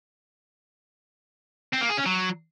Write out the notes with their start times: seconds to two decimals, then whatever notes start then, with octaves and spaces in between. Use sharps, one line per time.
1.73 C4
1.81 A#3
1.89 G#4
1.97 C#4
2.05 F#3